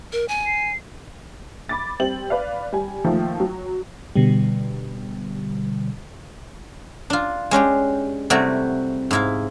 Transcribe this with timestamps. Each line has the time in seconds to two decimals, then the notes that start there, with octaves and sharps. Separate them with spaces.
0.12 A#4
0.28 G#5
0.46 C7
1.69 B5 D6 A6
2.00 G3 C4 F#7
2.30 B4 D5 F5
2.72 G3 G#5
3.04 D#3 F3 A3 A#3
3.40 F#3
4.16 B2 D3 G3
7.10 D4 F4
7.51 G#3 C#4 D4 G4
8.30 C3 G3 A3 E4 F#4
9.11 G#2 E4 F5